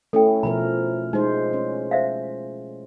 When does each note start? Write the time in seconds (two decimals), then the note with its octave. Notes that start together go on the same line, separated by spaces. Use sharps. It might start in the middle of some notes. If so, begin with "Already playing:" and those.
0.13 A3 C#4 E4 A4 G5
0.43 B2 F3 A#4 B5
1.13 G#3 D#4 C5
1.53 C#4
1.91 C5 E5 F5